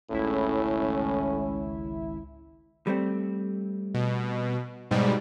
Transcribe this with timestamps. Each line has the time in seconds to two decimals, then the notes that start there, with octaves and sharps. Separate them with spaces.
0.11 G#1 C#2 A2 C#4 E4
2.87 G3 A3 C4
3.94 B2
4.91 G#2 B2 G3